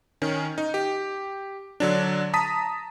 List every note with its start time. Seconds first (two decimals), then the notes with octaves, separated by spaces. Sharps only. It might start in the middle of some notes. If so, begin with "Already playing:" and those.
0.22 D#3 C#4
0.58 D#4
0.74 G4
1.80 D3 F#3 D4
2.34 A5 A#5 D#6 B6